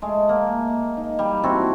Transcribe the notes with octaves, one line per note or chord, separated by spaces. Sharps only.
G#3 A3
A#3
D#4
G3
C4 E4 F#4 A4